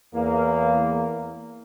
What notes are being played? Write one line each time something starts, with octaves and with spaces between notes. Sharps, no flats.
E2 A#3